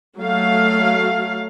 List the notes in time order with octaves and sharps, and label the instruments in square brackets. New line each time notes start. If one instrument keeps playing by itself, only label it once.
[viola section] F#3 A3 F5